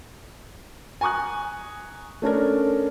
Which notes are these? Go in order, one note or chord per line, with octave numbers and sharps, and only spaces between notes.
G#5 A#5 C#6 D#6 F#6
A3 C#4 D4 A#4